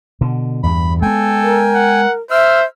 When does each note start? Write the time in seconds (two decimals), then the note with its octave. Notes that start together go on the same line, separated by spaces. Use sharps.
0.21 B2 D3
0.63 E2 G2 B5
1.02 G#3 B3 A4 G5 G#5
1.42 A#4
1.75 F#5
2.31 C5 E5 E6 F6